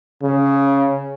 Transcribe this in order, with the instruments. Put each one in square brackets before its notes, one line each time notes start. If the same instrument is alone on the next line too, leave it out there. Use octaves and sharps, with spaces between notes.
[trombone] C#3